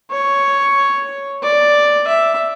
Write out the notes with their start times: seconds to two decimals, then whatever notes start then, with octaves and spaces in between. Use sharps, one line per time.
0.11 C#5
1.43 D5
2.08 E5